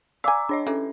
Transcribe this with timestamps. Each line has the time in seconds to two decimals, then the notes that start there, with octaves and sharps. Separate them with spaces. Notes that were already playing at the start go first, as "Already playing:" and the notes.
0.24 D5 F5 G#5 A#5 D6 E6
0.49 D4 C#5 D#5
0.67 E3 C#4 A4